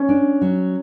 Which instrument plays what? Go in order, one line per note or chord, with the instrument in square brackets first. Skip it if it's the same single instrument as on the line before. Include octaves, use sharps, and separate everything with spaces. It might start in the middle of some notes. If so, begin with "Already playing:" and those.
Already playing: [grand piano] C#4
[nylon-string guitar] D4
F#3